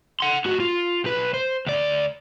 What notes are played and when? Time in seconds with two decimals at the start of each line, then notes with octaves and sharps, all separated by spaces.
0.20 F#5 C6
0.45 A2 F#4
0.60 F4
1.04 B1 B4
1.34 C5
1.66 D2 D5